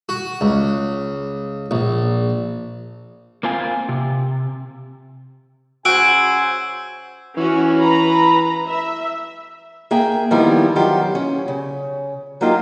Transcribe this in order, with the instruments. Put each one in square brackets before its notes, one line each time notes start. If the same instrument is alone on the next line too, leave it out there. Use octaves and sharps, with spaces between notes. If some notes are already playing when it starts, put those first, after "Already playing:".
[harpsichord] F#4
C#2
A#1
[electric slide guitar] A#3 C4 F4 G#5
C3
[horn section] C#3 C5 G#5 [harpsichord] F#4 [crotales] E6 [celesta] D7
[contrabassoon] E3 [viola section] C#4 F#4
[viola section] B4 A#5 B5
E5
[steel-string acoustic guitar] A#3 G#4 E5 G5
D#3 F3 G3 B3 D#4 E4
D#3 F#3 F4 G4
C#4
C#3
F#3 A#3 D#4 F4 G4